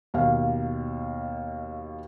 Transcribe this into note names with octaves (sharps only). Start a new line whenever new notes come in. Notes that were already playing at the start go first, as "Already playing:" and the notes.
D#2 B2 F5